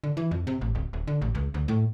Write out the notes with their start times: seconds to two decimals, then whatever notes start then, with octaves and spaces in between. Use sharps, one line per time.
0.04 D3
0.17 E3
0.31 F2
0.47 C3
0.61 A1
0.75 D1
0.93 D#1
1.07 D3
1.22 A1
1.35 C#2
1.54 D2
1.68 A2